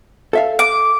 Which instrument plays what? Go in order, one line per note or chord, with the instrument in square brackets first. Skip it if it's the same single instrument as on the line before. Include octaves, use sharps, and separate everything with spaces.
[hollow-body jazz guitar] A4 E5 F5
[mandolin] D6